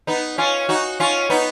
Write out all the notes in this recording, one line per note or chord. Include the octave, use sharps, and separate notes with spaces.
B3 D#4
C#4 F4
D#4 F#4
C#4 F4
B3 D#4